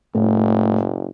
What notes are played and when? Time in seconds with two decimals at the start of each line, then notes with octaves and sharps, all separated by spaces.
0.15 F#1 A2